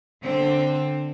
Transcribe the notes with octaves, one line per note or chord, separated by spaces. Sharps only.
D3 C4